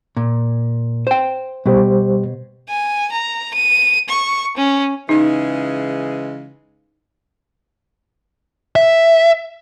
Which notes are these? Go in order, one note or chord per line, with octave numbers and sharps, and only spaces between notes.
A#2
C5 G5
B2 G3 G4 C5
G#5
A#5
D#7
C#6
C#4
C#3 E3 G#3 D#4
E5